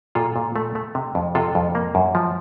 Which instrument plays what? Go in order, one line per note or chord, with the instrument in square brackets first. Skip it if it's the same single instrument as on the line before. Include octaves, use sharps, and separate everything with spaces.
[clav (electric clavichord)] A#2 F4 A4
A#2
A3
A3
C3
F2
C3 F4 A4
F2
A#3
F#2
F3